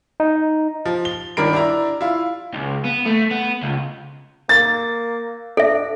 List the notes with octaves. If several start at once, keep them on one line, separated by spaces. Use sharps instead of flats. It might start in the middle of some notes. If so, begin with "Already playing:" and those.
D#4
F3
G7
G1 D#3 D4 A#4 B5 D7
D4 E4 A#5
E4 F4
C#2
B3
A3
B3
C#2
A#3 A6
D4 A4 E5